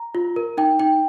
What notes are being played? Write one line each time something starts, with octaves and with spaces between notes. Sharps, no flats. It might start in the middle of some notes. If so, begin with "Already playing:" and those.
Already playing: A#5
F4
A#4
D#4 G5
D#4 G5